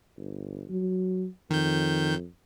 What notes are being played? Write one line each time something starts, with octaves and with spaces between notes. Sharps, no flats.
G1
F#3
F2 D#3 G6